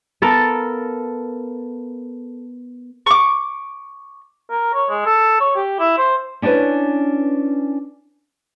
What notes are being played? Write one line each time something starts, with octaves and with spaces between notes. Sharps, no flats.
B3 A4 A#4 F5 A5
C#6 D6
A#4
C#5
G#3
A4
C#5
G4
E4
C5
C#4 D4 E4 G4 B4 C#5